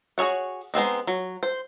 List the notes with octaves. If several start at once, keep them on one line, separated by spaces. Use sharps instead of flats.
F#4 G#4 A4 C#5 F#5
G#3 B3 C4 D#4
F#3
C5